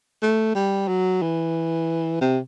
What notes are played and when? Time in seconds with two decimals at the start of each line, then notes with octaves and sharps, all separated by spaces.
0.23 A3
0.55 G3
0.88 F#3
1.22 E3
2.21 C3